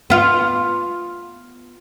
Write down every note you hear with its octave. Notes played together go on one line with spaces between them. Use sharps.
B3 F4